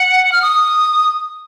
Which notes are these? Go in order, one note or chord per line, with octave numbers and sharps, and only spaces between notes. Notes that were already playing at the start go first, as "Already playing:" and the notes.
Already playing: F#5
F6
D#6